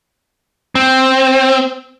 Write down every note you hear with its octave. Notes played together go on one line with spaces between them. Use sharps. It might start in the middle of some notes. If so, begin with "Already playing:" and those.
C4